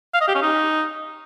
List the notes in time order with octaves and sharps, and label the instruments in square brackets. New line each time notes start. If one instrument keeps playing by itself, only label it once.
[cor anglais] F5
D#5
G4
C#4
D#4